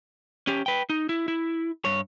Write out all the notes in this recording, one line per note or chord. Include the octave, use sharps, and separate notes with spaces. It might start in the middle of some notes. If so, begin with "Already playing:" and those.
C#4 G4
B4 G5
D#4
E4
E4
G2 C#5